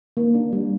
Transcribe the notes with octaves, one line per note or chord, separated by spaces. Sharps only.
A#3
D4
G3